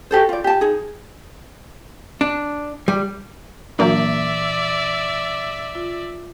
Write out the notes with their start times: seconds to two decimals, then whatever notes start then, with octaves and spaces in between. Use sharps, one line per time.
0.11 F#4 G4 A4 C5
0.29 F4 D5
0.44 G4 A5
0.61 D#4 G#4
2.21 D4
2.88 G3
3.79 A#2 E3 F#3 A#3 D4 D5 E5
5.75 F4